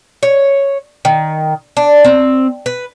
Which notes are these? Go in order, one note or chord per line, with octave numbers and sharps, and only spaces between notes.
C#5
D#3
D4
C4
B4